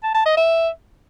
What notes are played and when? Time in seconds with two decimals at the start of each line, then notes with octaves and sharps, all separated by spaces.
0.03 A5
0.15 A5
0.26 D#5
0.37 E5